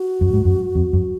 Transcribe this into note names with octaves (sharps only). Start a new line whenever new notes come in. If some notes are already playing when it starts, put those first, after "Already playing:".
Already playing: F#4
F#2
G#2
F#2
F2
F#2